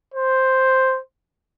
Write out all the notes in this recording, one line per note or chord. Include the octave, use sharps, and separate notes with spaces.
C5